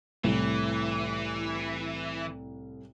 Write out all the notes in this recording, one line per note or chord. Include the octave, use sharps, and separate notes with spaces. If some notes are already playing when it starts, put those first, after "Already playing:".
C2 A2 E3